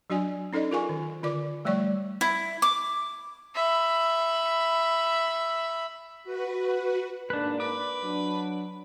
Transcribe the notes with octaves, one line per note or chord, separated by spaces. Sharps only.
F#3 D4 F#4 D5 G#5
C#4 D#4 A4 D5 D#5
F4 G#4 A#4 F5 G#5 C#6
D#3
D3 F4 A#4 D5 D6
F3 G3 A3 C#5 D5 C#6
E4
D6
E5 B5
F#4 B4
G#2 A#3 D4 B4 D5
B4 D6
F#3 D4